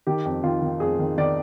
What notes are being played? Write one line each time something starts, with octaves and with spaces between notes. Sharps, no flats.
D#3 G4
F2
D#3 F4
D#3
F2 G#4
D#3
D#3 D5